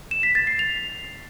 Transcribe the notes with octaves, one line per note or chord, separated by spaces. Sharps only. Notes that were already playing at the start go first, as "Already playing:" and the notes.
E7
B6
A6
C7
F7